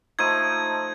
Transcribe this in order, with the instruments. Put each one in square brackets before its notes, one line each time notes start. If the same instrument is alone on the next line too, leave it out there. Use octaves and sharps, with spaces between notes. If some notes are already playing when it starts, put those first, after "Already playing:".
[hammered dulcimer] F3 A3 D#4 [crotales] G#6 D#7